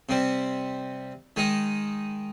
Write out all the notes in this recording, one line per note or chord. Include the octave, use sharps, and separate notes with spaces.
C3 G3 C4
D#3 G#3 D#4